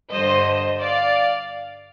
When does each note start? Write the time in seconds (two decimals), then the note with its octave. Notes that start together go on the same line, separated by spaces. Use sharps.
0.11 G2 D3 C5 D#5
0.81 D5 F5